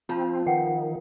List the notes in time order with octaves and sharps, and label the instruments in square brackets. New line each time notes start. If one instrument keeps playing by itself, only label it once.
[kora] F3 [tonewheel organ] C4 [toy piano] F4 A5
[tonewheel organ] D#3 [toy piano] B4 F#5 G5